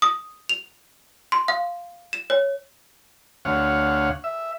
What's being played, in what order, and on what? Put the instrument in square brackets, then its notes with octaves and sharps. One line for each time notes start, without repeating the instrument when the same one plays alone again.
[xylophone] D#6
F7
C6
F5
E7
C#5
[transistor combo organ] D2 C#5 F5 F#5
E5